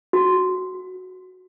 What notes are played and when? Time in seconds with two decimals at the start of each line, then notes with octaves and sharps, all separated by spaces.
0.13 F#4